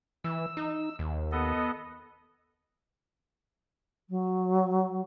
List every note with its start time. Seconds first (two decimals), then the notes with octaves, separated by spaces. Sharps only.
0.24 E3 E6
0.57 D#4
0.99 D#2
1.32 B3 A4 D#5
4.09 F#3